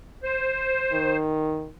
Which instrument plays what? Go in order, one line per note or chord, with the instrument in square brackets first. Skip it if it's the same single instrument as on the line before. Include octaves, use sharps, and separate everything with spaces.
[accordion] C5
[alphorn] D#3